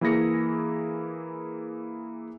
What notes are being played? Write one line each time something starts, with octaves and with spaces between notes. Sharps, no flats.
E3 A#3 E4 G#4 A#6 C#7